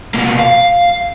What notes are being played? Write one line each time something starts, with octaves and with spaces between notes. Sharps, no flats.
B2 A#3
F5